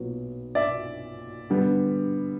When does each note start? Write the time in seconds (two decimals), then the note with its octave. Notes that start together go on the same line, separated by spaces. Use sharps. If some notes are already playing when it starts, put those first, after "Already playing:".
Already playing: B1 A#2 F#3 B3
0.55 D5 E5
1.50 D3 G3 B3